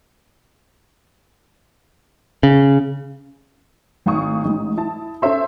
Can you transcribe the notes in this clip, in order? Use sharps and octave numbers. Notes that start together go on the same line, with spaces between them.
C#3
G#1 A2 F5 C#6 D#6
A1 G#2
E4 A5
C#4 A4 C5 E5 C6